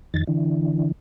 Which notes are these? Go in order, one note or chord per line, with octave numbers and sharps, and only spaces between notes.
F2 D#3 A6
D3 E3